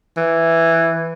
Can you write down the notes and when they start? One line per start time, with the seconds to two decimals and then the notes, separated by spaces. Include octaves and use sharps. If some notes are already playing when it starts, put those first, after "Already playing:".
0.17 E3